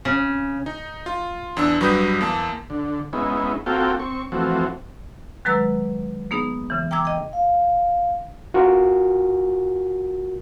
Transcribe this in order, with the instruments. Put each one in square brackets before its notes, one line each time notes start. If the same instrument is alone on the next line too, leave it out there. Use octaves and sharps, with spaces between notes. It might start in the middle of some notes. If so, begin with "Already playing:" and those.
[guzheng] C#3
[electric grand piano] D#4
F4
E2 D4 E6
G2 F#3 G3 B4 D#6 G6
E2 A#3 A5
[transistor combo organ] D3
G#3 B3 C#4 D#4 E4
A#3 C4 F4 F#4 A4 G5
C4 C#6
E3 F3 A3 C4 F#4
[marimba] D#3 F#3 G#3 B4 A#5 E6
A#3 B3 D#4 G#4
C#3 E3
G5 A#5 D6 E6 G#6
D#5 G5
[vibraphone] F5
[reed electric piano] F4 F#4 A#4